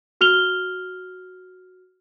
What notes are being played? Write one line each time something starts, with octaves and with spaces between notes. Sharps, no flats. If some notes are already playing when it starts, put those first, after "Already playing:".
F#4 F6 F7 G7